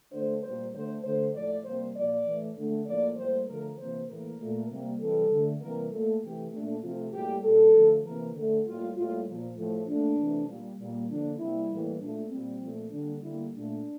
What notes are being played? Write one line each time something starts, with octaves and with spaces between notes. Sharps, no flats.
D3 A3 C5
A#2 G3 A#3 C5
D3 A3 C5
D3 A3 C5
A2 F3 A3 D5
C3 G3 A#3 C5
A#2 F3 A#3 D5
A2 E3 A3
D3 A3
A2 F3 A#3 D5
A2 G3 A#3 C5
D3 F3 A3 A#4
C3 E3 A#3 C5
A2 E3 A#3 A#4
A#2 A3
C3 G3 A#3
C3 E3 G3 A4
D3 A3
C3 E3 G3 A#3 A#4
A#2 A3 A4
C3 E3 A3 G4
A#2 A3 D4
C3 F3 A3 F4
A2 G3 A#3 G4
A#2 G3 A#3 A4
D3 F3 A3
C3 E3 A#3 A#4
D3 A3
A2 G3 A#3 F4
A2 G3 A#3 F4
A#2 F3 A#3
A2 F3 A3
A#2 A3 D4
C3 E3 A3
A#2 G3 A#3
A#2 G3 A#3
D3 F3 A#3 D4
C3 G3 A#3 E4
A2 E3 G3 A#3
A#2 A3 D4
A#2 G3 A#3 C4
A#2 F3 A3
D3 G3 A#3 D4
D3 G3 A#3 E4
A#2 A3 D4